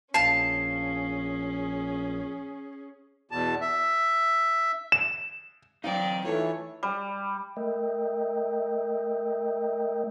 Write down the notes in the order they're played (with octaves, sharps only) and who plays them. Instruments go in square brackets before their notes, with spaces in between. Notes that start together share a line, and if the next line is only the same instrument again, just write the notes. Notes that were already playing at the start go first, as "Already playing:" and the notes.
[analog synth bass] A#1 [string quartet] C#4 G#4 [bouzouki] F5 A5 [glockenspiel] C7
[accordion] E2 B2 A5
E5
[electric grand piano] E7
[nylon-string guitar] F#3 C4 F5 [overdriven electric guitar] D#4 G5 [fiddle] D5
[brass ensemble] E3 A3 [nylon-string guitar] F4 [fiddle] C#5
[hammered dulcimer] G3
[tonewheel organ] A3 A#4 D#5 E5 G5